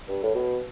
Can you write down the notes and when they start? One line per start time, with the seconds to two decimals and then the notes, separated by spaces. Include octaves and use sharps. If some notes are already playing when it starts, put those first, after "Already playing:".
0.08 G2
0.23 A2
0.34 B2